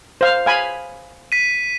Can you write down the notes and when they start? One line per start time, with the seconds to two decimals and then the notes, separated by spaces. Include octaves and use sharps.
0.21 C5 F5
0.46 F5 G#5 B5
1.32 B6 D#7